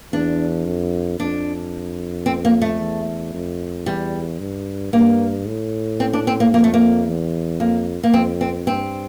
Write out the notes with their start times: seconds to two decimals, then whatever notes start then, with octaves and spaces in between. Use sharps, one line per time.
0.13 E2 D4
0.66 F2
1.20 F2 D4
2.26 C4
2.45 A#3
2.62 A3
2.79 E2
3.34 F2
3.86 E2 G3
4.39 G2
4.93 G2 A#3
5.47 A2
6.00 C4
6.13 D4
6.27 C4
6.40 A#3
6.54 F2 A#3
6.64 A3
6.74 A#3
7.07 E2
7.60 F2 A#3
8.03 A#3
8.13 F2 C4
8.41 C4
8.67 G2 C4